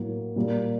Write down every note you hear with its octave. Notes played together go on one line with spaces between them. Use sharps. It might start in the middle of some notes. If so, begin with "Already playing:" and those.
Already playing: A2 F#3 A#3
A#2 G3 A#3